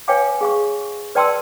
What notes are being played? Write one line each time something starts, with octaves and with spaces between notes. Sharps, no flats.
B4 C#5 F5 G5 G#5 D6
G#4 F5 C#6
B4 D5 G5 A5 C6 E6